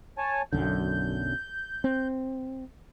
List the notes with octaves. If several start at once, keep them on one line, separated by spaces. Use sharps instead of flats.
C#5 G#5 A5
B1 F#2 D3 G6
C4